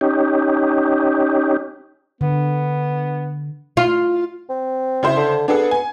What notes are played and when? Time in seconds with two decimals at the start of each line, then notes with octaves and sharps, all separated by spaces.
0.01 C#4 D#4 G4
2.21 D3 B3
3.77 F4
4.50 C4
5.03 C#3 E4 C5
5.16 D3
5.48 B3 D4 G#4 A4
5.71 G#5